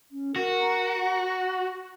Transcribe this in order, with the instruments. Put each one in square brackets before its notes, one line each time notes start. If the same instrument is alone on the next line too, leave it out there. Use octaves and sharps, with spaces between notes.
[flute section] C#4
[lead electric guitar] F#4 [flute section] A#4
[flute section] A#5
F#5